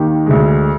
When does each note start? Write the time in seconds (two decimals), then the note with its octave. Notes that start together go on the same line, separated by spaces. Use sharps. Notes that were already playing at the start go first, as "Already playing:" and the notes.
Already playing: D#2 D#3 D#4 G4
0.26 D2 D3 G#3